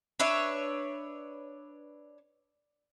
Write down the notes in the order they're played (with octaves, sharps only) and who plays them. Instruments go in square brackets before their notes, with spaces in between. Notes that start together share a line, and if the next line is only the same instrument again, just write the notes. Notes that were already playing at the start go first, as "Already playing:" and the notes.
[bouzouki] D4 B4 C#5 E5